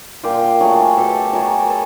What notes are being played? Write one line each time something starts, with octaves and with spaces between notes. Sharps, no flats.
A#2 F4 G4
F#3 A3 F#4 G#4
B2 G4 A4
F#3 A3 G#4 A#4
A4 B4